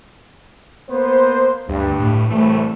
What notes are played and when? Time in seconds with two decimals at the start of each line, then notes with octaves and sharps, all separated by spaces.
0.89 A#3 B3 C5
1.69 D2 G2
2.00 A2
2.30 C2 A2 E3 A3